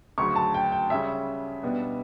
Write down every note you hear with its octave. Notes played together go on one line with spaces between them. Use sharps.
D2 C#3 F#3 C#6
A5
G5
G5
C#3 G3 C#4 E5
B2 G3 B3 D4